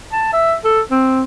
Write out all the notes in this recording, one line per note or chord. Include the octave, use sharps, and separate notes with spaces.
A5
E5
A4
C4